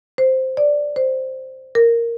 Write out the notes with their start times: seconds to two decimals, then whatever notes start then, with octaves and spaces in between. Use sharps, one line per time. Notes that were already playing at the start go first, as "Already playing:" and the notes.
0.18 C5
0.57 D5
0.96 C5
1.75 A#4